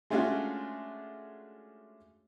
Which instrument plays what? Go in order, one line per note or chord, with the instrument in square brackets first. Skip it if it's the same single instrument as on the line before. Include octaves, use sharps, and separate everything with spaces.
[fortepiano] G#3 A3 C#4 D4 F4 F#4